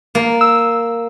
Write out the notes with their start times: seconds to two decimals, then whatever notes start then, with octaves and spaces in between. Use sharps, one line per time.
0.15 A#3
0.41 E6